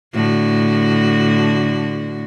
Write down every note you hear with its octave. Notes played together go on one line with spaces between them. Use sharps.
A2 D3 F#4